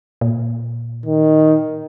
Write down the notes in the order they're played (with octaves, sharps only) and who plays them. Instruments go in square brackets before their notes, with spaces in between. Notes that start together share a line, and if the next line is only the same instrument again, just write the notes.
[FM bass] A#2
[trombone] D#3